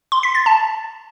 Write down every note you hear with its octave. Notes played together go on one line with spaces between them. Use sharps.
C6
B6
A6
A5